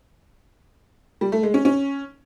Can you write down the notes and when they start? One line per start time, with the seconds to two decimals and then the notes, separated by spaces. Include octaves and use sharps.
1.21 G3
1.32 A3
1.43 G#3
1.54 C#4
1.65 C#4